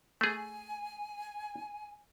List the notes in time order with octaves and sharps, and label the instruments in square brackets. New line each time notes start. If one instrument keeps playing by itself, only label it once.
[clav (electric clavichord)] A3 G#4 [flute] G#5